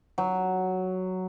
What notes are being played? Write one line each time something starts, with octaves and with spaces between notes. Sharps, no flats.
F#3